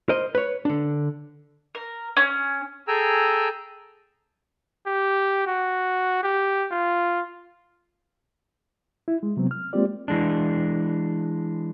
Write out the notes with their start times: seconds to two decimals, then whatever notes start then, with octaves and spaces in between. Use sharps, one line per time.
0.09 A#4 C5 D#5
0.35 B4 C#5
0.65 D3 D4
1.75 A#4
2.17 C#4
2.88 G#4 A4 G5 G#5 A#5 E6
4.87 G4
5.46 F#4
6.23 G4
6.71 F4
9.08 E4
9.23 G#3
9.37 C3 F#3 B3 C4
9.51 F6
9.73 G#3 A#3 C4 F4 G4 D5
10.08 E3 G#3 D4